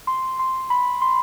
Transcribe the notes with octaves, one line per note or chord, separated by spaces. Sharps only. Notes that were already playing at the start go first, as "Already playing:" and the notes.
C6
C6
B5
C6